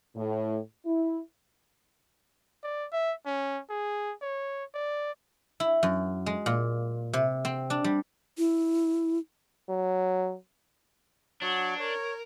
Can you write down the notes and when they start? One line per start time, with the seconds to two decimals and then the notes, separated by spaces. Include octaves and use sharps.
0.16 A2
0.85 E4
2.64 D5
2.93 E5
3.26 C#4
3.70 G#4
4.22 C#5
4.74 D5
5.60 E4
5.83 F#2
6.26 G#3
6.46 A#2
7.13 C3
7.45 C4
7.70 D4
7.84 G3
8.38 E4
9.69 F#3
11.42 F#3 D4 C#5 F#5
11.79 A#4 C#5